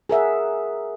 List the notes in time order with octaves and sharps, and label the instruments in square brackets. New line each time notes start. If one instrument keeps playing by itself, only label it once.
[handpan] G#4 A#4 E5 F#5